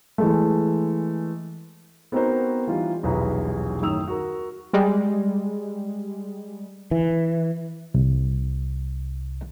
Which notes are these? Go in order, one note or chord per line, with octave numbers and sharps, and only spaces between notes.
E3 G#3 A3
B3 C4 D#4 F#4 A#4 C5
E3 G3 D#4 F4
D#1 B1 E2 E3 B4 A#5
F#2 A2 D#3 D#6 E6 F7
F#4 A#4
G3 G#3
E3
C2